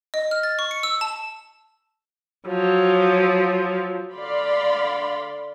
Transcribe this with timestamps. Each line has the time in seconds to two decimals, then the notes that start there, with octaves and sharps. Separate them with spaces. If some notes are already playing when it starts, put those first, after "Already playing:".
0.14 D#5
0.31 F6
0.43 A6
0.59 C#6
0.71 C#7
0.83 E6
1.01 A5
2.47 F3 F#3
4.13 D3 D5 F5 B5 C6